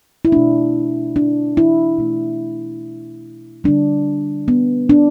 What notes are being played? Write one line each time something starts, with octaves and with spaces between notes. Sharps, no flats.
E4
B2 A3 D4
D4
E4
B2 A3
D3 G3 D4
B3
D4